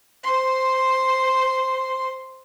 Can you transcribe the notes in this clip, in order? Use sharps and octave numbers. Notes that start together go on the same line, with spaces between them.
C5 C6